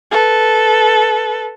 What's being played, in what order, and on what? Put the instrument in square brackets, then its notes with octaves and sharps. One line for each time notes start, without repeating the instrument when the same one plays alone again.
[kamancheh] A4 B4